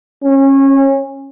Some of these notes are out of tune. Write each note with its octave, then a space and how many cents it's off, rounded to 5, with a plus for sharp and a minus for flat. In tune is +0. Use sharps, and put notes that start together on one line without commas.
C#4 -25